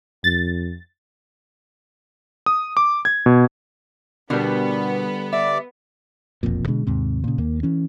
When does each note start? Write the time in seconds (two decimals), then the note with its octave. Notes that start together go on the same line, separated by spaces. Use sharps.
0.24 F2 A6
2.46 D#6
2.77 D6
3.05 G#6
3.26 B2
4.30 B2 D3 G3 B3 A#4
5.33 D5 E5 D6
6.43 E1 A#1 F2 A#2
6.68 B2 D3 G#3
6.87 D#2 G#2 C3
7.24 A#2 C#3
7.38 D#2 A#3
7.63 E3 C#4